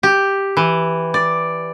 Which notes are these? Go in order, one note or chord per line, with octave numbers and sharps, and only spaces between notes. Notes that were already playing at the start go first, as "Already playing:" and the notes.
G4
E3
D5